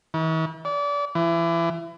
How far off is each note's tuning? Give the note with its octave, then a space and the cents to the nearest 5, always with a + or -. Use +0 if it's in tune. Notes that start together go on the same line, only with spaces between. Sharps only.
E3 -45
D5 -30
E3 +30